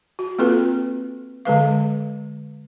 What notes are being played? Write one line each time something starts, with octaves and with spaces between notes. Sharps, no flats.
F#4
A#3 C4 F4 A4 B4
D3 G#3 B4 F5